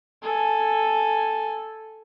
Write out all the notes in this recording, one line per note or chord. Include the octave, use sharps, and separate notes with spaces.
A4 G#5